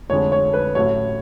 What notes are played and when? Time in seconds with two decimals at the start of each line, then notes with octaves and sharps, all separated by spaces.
0.09 F1 F2 D3 G#3 C#5
0.32 C#5
0.53 B4
0.75 A1 A2 F#3 C#5